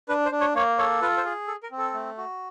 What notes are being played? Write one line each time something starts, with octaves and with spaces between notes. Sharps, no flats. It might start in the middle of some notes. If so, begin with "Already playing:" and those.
D4 B4
C5
D4
C#5
A#3 C#5
A4 C#5
F4 B4
C5
G#4
A4
A#4
C4
A4
A3
F#4